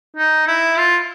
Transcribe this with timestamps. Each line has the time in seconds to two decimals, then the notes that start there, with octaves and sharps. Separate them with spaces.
0.16 D#4
0.47 E4
0.77 F4